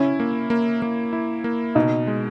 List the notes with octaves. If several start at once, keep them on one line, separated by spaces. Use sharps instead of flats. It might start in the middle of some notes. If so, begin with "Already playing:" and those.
Already playing: C#4 E4
A#3
A#3
A#3
E4
A#3
B2 D#4
G#3